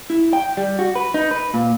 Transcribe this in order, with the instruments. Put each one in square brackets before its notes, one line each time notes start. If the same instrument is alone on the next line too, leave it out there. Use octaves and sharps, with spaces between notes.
[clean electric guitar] E4
G5
G3
F#4
B4
D#4
B4
A#2